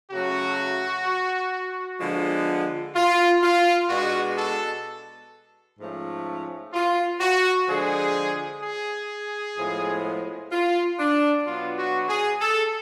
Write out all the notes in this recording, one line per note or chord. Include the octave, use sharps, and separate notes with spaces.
C#3 F#3 A3 C#4 F#4
D3 F3 G#3 B3
F4
F4
B2 G#3 B3 D4 F#4
A4
G#2 F3 A3 C#4
F4
F#4
D3 F3 G#3 G#4
G#4
A2 F3 G#3 B3
F4
D4
B2 F#3 B3 D4 F4
F#4
G#4
A4